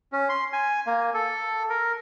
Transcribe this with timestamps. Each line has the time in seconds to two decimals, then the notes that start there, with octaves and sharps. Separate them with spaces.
0.12 C#4
0.29 C6
0.53 G#5
0.87 A#3
1.14 A4
1.70 A#4